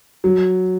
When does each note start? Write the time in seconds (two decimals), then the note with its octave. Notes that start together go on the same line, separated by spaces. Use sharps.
0.24 F#3